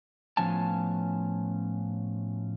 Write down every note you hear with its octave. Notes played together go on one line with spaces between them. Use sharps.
A2 F3 B3 C#4 G#5 A5